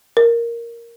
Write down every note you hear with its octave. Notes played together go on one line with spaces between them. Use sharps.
A#4